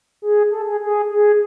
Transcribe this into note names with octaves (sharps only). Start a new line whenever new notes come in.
G#4
A4
G#4
G#4
G#4